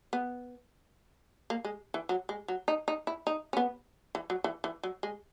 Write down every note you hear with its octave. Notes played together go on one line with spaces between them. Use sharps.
B3
A#3
G#3
E3
F#3
G#3
F#3
D#4
D#4
E4
D#4
C#4
B3
E3
F#3
E3
E3
F#3
G#3